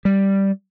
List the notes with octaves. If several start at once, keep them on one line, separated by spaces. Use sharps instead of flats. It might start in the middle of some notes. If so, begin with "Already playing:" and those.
G3